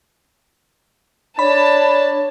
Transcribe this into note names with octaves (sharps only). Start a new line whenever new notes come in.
D4 C#5 A5 B5